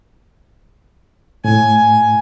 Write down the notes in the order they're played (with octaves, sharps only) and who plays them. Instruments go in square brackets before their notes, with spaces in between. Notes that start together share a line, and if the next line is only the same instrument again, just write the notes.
[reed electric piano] A2 [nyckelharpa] G#5